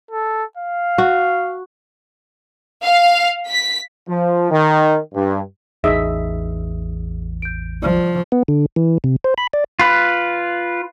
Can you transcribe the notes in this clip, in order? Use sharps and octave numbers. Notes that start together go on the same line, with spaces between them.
A4
F5
F#4
F5
B6
F3
D#3
G2
A1 E2 D#4 G#4 D#5 E5 D#6
G6 D7
F3 D5
B3
D3
E3
C3
C5
B5
D5
F4 B4